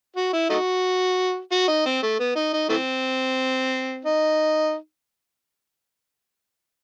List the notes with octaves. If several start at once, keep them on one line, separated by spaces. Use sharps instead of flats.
F#4
E4
A3 D#4 F#4
F#4
D#4
C4
A3
B3
D#4
D#4
E3 A3 C4
D#4